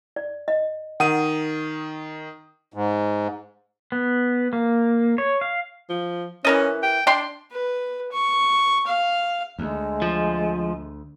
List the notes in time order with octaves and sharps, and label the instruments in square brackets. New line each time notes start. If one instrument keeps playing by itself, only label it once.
[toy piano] D5
D#5
[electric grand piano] D#3 D#6 D#7 [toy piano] F#5
[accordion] G#2
[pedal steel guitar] B3
A#3
C#5
F5
[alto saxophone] F3
[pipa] E3 A#4 D#5 [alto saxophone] C#4
[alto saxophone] G5
[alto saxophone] D4 [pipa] G5 C6
[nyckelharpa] B4
C#6
F5
[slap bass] D2 [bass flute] G#3
[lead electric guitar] F3